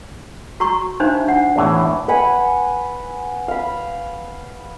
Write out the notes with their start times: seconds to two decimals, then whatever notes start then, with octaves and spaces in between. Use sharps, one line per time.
0.60 F#4 A#5 C#6
1.00 D4 D#4 C5 E5 F5
1.28 D4 F#5
1.56 E2 A2 E3
2.08 B4 F#5 G#5 B5
3.48 F5 B5